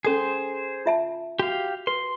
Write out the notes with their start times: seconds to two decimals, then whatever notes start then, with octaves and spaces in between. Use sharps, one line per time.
0.05 C#4 G#4 A4 C5 D#6
0.86 F4 E5 A5
1.39 F#4 G4 F5
1.87 B4 C6